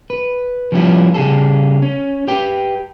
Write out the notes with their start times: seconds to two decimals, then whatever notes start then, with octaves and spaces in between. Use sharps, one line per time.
0.10 B4
0.72 F3 G3 B3 C#4 E4
1.14 C#3 G3 G#4 A4
1.82 C#4
2.28 G4 B4 G5